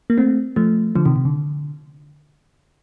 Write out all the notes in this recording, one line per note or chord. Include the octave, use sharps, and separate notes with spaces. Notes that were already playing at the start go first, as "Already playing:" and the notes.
A#3
A3 C4
F3 A3
D3 F3
C3 D#3
C3
D3